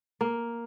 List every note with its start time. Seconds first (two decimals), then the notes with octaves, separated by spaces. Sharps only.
0.21 A#3